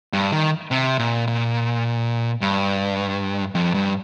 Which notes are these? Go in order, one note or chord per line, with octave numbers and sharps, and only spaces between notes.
G2
D#3
C3
A#2
A#2
G2
F2
G2